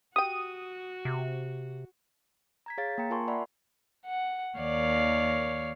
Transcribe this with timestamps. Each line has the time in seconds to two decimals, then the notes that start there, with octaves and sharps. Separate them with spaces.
0.16 F#4 G4 G5 D#6 D#7
1.05 C3
2.66 A#5 G#6 B6
2.78 G#4 C#5 F5 A6
2.98 A#3 G5 A#5 C#7
3.10 F4 A#4 G#5 A5 C6 C#6
3.28 D5 E5 F#5 B5 C6
4.06 F#5
4.58 D#2 D#3 C#5 D5 F5